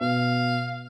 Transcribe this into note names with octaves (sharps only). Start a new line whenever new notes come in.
B2 F5